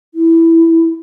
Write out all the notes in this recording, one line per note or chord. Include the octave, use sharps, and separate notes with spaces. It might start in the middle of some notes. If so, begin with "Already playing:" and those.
E4